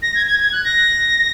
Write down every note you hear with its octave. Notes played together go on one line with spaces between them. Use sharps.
A#6
G#6
G#6
G#6
F#6
A#6